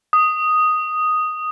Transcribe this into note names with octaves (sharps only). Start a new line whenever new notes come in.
D#6